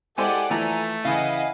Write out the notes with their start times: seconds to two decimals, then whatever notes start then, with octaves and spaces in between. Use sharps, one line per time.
0.18 G#3 E4 G4 A4 C5 D5 F#5 G#5
0.50 E3 F3 A3 E4 A4 G#5 A#5
1.05 C#3 E3 E4 D#5 F5 F#5 G#5